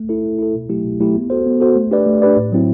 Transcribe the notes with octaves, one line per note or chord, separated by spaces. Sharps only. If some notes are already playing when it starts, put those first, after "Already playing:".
Already playing: A3
E4 A4
A3
E4 A4
B2
F#3 A3 E4 G4
B2
F#3 A3 E4 G4
B3
F#4 A4 C5
B3
F#4 A4 C5
A3
D4 G4 B4 D5
A3
D4 G4 B4 D5
A2
F#3 C4 E4